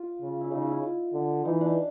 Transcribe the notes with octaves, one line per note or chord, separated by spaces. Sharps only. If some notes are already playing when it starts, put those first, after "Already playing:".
Already playing: F4
C#3
E4
C#3 D#4
E4 F4
F4
D3
E3 D#4
D4